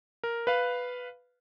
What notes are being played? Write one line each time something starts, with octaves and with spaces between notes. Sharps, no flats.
A#4
B4 F5